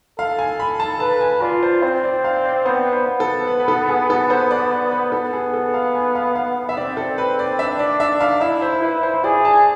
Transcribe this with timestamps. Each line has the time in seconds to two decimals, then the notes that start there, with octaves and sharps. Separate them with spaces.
0.18 A4 F5
0.39 G#5
0.60 B5
0.80 A5
1.00 B4 A5
1.21 G#5
1.42 F4 D5
1.63 C5
1.83 C4 C5
2.04 D5
2.24 F5
2.45 D5
2.65 B3 C5
2.93 C5
3.07 B3
3.20 A4
3.47 B4
3.60 B4
3.68 A4
3.89 G#4
4.10 A4
4.30 C5
4.51 D5
4.91 B4
5.12 B3 A4
5.33 G#4
5.54 A4
5.74 F5
5.95 G#5
6.15 F5
6.36 F5
6.69 E5
6.77 C4 D5
6.97 A4
7.18 B4
7.39 D5
7.59 D4 E5
7.79 D5
8.00 E5
8.20 F5
8.41 E4 E5
8.62 C5
8.82 E4 B4
9.03 C5
9.14 C5
9.24 G#4 D5
9.45 A5